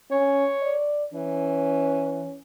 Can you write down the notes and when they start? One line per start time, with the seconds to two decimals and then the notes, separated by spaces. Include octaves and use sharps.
0.11 C#4 C#5
0.62 D5
1.14 E3 C#4